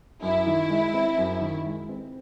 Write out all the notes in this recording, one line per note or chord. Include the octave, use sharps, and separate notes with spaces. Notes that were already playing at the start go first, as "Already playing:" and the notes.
F#2 E4
D#3
G#3
C4
F#2
D#3
G#3
C4